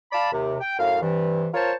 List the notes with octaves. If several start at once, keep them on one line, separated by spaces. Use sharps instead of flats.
D5 F5 A5 B5
D#2 C3
G5
F#2 A2 F5
G2 C3 E3
F4 A#4 C5 C#5 A5